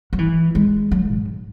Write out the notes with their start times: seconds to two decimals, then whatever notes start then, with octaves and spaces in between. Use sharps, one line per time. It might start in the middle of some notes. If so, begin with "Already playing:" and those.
0.13 F#3
0.19 E3
0.55 G#3
0.91 F#3
1.09 G#2